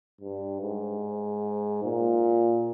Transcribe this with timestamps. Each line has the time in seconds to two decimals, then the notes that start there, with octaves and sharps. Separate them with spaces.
0.21 G2
0.61 G#2
1.84 A#2